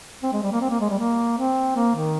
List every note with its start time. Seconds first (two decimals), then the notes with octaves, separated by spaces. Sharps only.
0.23 C4
0.32 G#3
0.42 G3
0.52 A#3
0.61 C4
0.70 A#3
0.80 G#3
0.90 G3
0.99 A#3
1.38 C4
1.76 A#3
1.95 D#3